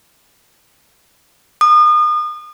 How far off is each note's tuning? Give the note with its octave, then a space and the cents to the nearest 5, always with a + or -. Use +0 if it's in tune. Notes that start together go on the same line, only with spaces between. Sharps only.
D#6 -35